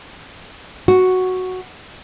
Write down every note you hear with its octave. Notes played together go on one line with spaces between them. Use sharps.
F#4